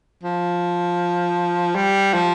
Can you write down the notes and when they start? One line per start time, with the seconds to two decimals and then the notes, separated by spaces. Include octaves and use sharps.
0.23 F3
1.75 G3
2.14 F3